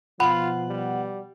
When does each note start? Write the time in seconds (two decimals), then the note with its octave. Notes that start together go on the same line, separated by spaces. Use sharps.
0.20 B2 F3 F4 F#5 B5
0.68 G3